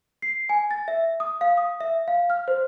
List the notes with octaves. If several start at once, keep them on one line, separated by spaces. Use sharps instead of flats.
C7
G#5
A6
E5
D#6
F5
D#6
E5
F5
F6
C5